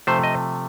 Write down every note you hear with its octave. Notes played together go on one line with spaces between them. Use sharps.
C3 F3 A3 C5
D#5